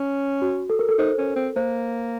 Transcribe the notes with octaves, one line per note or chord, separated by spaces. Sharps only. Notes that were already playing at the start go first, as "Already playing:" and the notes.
Already playing: C#4
F#4
A4
A#4
A4
D#4 C5
C#4
C4
A#3 C5